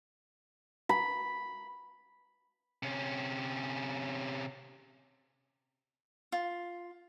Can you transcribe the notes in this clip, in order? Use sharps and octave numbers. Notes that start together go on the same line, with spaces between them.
B5
C3 C#4
F4